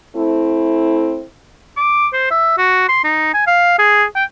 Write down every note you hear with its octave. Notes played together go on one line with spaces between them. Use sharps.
A3 C4 E4
D6
C5
E5
F#4
C6
D#4
G#5
F5
G#4
G5